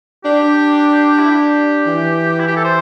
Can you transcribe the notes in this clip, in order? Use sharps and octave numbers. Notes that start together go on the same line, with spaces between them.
D4 G4
E4
G4
E3
E4
G4
A4
C5